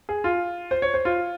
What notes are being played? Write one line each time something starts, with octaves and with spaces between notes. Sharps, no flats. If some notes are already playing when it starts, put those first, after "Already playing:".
G#4
F4
C5
C#5
C5
F4